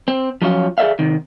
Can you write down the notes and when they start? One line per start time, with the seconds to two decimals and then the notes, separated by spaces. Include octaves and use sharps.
0.08 C4
0.42 F3 F#3 C#4 F4
0.78 G#4 A4 B4 D5 E5 F5
0.99 C3 D#3